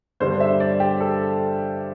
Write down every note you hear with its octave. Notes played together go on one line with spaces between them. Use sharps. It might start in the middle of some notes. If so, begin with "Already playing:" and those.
G2 D3 G3 C5
E5
D5
G4
A4